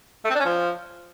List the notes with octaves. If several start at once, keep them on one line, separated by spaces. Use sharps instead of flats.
A3
C4
D4
C#4
F3